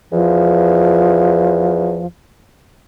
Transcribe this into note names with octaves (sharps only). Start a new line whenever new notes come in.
E2 F3